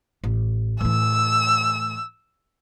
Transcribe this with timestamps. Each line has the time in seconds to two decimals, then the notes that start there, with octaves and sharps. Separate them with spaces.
0.24 A1
0.81 A2 E3 E6